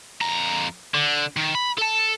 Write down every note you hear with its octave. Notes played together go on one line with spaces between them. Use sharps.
F2 A#5
D3
D#3
B5
A4 A5